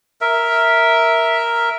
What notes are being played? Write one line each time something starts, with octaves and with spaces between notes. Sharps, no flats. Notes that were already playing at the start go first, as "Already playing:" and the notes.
A#4 E5